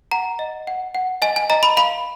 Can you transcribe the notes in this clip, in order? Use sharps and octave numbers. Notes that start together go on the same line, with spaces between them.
F#5 A#5
D#5
F#5
F#5
D#5 G#5
G#5
D#5 A#5
B5
F5 B5